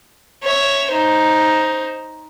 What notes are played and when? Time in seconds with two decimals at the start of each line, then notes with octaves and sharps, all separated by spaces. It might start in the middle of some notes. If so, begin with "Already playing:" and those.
0.43 C#5 E5
0.91 D#4 C5